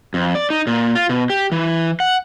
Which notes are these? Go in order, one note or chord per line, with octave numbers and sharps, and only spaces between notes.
F2
D5
D#4
A#2
F4
B2
G4
E3
F#5